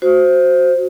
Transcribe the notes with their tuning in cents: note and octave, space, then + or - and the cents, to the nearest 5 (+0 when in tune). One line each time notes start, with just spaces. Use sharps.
F#4 +0 C5 +0